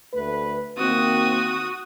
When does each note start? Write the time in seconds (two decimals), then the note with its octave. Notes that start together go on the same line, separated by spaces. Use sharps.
0.14 D2 A3 B4
0.78 D#3 A#3 C4 F#4 D#6